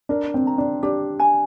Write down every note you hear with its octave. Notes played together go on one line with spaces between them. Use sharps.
D4 A#4
C4
A#5
D4
D4 G4
G#5